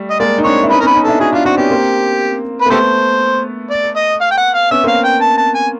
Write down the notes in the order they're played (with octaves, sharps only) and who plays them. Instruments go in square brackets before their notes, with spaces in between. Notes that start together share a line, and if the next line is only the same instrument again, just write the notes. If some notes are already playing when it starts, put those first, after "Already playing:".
Already playing: [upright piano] G3 A3
[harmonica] D#5
[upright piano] G#3 A#3 [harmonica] D5
[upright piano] D#4
[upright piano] C4 D4 [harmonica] C#5
[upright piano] E4
[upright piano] C#4 D#4 [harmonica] B4
[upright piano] B3 C#4 [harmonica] A#4
[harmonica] B4
[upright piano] C#4 D#4
[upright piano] D4 E4 [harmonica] A4
[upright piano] E4 F#4 [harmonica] G#4
[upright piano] D4 E4 [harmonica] F4
[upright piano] C4 D4 [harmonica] F#4
[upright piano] B3 C#4 [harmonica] G4
[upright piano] A#3 C4
[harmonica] B4
[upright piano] A#3
[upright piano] A3 B3 [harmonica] G4 A4 C5
[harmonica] D5
D#5
F5
G5
F#5
F5
[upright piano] B3 C#4 [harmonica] E5
[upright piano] A#3 C4
[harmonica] F5
G5
A5
A5
G#5